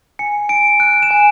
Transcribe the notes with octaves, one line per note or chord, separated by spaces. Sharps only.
G#5 C#7
G#5 D7
F#6 D7
E7
G#5